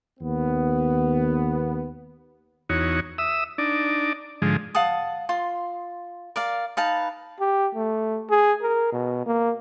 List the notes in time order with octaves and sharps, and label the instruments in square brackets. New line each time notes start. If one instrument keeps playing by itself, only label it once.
[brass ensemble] D#2 B3
[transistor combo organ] E2 D#4 F#4 C#5
E5 D#6 E6
D4 D#4 D5
G#2 D3 F3 G#3
[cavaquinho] F5 F#5 A5 D#6
F4 C6
A#4 D5 F5
D#4 B4 F5 A5
[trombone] G4
A3
G#4
A#4
B2
A#3